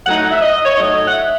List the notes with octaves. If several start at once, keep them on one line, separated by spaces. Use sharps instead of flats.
A2 F#3 A3 D#4 F#5
E5
D#5
C#5
A2 F#3 A3 D#4 D#5
F#5
E5